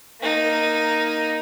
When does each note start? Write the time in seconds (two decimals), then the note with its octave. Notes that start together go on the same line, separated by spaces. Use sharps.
0.21 A#3 D#4